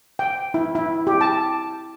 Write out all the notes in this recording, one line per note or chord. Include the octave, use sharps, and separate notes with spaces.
G5
E4
E4
G4
A5